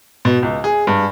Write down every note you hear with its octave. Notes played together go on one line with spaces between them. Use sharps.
B2
C#2
G#4
G2